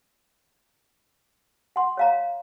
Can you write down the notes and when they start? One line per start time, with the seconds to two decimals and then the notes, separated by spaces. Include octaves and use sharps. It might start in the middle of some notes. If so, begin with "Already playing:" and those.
1.76 F#5 C6
1.97 C#5 F5 A#5